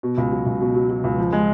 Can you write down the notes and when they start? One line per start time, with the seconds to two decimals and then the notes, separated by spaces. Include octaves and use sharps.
0.03 B2
0.18 C#2
0.31 F#3
0.46 C#2
0.61 B2
0.75 F#3
0.90 F#3
1.04 C#2
1.18 F3
1.33 G#3